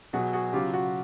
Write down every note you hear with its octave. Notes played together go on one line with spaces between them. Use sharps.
B2 F#3 F#4 G#4
F#4 G#4
C#3 F#3 F4 G4
F#4